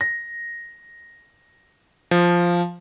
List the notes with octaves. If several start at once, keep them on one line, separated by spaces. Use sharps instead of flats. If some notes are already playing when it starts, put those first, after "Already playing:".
A#6
F3